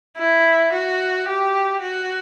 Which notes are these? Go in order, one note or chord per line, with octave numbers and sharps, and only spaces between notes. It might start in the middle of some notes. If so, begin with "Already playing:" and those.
E4
F#4
G4
F#4